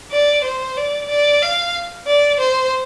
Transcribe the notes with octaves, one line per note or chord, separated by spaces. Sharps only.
D5
C5
D5
D5
F5
D5
C5